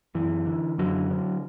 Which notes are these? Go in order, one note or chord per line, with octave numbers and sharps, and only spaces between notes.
F#2 E3
D3
F#2 D3 F#3
D3